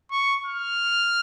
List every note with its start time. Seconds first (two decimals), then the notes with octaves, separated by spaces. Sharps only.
0.11 C#6
0.46 F6